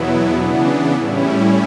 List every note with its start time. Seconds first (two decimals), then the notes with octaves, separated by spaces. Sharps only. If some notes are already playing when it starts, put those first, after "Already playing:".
Already playing: E2 B2 F#3 B3 E4
0.30 C#3 E3 B3 D4
0.92 A2 G3 C#4 E4